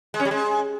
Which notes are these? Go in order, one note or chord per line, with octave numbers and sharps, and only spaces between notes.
G#3
C#4
G3
G#3